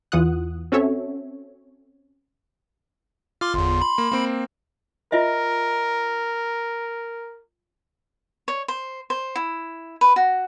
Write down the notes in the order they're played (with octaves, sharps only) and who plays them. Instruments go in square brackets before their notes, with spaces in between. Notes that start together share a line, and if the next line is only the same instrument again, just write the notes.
[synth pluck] E2 E3 F4 F#5 D#6 F#6
C4 C#4 F#4 A4 C#5 E5
[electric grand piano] F4 [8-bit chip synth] C6 D6 F6
[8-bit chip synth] G1 E2 [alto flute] C6
[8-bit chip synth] B5
[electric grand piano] A#3
A#3 C4 D7
[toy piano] F4 D#5 E5 [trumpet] A#4
[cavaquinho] C#5
C5
C5
E4
B4
F#4